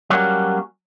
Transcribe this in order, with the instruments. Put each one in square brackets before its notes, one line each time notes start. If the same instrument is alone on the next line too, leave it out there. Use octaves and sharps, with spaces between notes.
[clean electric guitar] F#3 G3 A#3 C#4 F#4